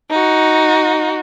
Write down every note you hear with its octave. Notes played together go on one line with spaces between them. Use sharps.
D#4 F#4